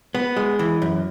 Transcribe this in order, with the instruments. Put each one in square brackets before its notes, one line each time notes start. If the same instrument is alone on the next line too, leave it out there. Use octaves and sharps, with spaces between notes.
[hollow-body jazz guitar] B3
G#3
E3
F#2